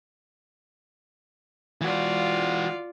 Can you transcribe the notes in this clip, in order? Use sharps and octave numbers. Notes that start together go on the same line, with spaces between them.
E3 F4 F#4 D5